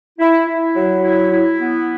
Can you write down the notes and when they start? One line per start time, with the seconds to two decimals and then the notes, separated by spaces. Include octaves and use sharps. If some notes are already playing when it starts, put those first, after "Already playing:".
0.19 E4
0.47 E4
0.74 F#3
1.02 E4
1.30 E4
1.58 B3